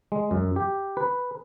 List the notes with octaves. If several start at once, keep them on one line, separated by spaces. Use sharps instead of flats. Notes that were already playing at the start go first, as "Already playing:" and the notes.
G#3
F#2
G4
B4